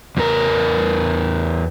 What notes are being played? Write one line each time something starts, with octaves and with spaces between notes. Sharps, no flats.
E2 E3 A#4